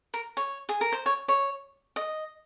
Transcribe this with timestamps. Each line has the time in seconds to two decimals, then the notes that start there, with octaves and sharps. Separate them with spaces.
0.14 A#4
0.37 C#5
0.69 G#4
0.81 A#4
0.92 C5
1.06 C#5
1.28 C#5
1.96 D#5